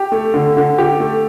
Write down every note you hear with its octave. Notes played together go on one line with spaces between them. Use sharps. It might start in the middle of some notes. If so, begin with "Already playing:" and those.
Already playing: G4
A3
D3
D3
G4
A3